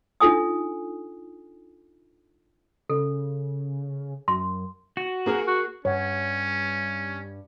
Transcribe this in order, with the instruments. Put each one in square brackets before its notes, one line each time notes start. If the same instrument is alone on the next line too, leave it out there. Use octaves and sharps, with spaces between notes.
[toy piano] D4 D#4 F4 A4 G#5 D#6
[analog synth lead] C#3 [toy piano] A4
[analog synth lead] F#2 [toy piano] C6
[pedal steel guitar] F#4
[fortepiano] A#3 G#4 A#4
[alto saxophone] F#4
[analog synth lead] G2 [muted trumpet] C#4 [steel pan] C#5 F#5